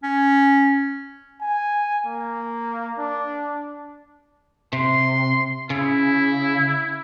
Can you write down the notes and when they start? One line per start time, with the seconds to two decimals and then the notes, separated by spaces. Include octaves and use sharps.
0.03 C#4
1.41 G#5
2.06 A#3
2.98 D4
4.73 C3 C6
5.70 C#3 E4